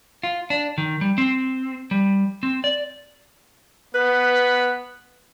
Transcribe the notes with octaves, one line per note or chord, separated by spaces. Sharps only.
F4
D4
D#3
G3
C4
G3
C4
D5
B3 B4